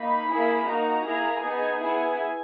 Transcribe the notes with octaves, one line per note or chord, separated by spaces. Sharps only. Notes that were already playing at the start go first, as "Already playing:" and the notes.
Already playing: A#3 D#4 B5
A#3 E4 G#4
A#3 D#4 F#4 A#5
A#3 E4 G#4
B3 D#4 G#4 G#5
B3 E4 G#4